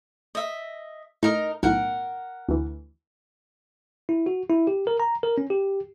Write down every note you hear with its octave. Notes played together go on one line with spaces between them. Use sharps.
D#5 E5
A2 D#4 A#4 D#5
B1 A2 A#4 F#5
D2 E3
E4
F#4
E4
G4
A#4
A#5
A#4
C#4
G4